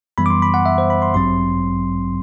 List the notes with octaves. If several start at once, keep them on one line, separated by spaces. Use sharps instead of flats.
F#2 E3 G3 B3 B5
D6
C6
B5
F#5
E5
C5
B5
C6
A1 G2 F#3 C4 C6